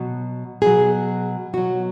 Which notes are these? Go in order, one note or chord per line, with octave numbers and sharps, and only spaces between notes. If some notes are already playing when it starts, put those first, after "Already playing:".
Already playing: B2 F#3
B2 F#3 G#4
B2 F#3 F#4